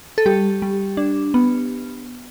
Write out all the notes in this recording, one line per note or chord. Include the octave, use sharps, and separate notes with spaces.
A4
G3 G4
G3
D4
B3